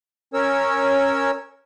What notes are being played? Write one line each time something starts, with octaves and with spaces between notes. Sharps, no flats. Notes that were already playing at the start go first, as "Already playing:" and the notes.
C#4 A#4 C#5 E6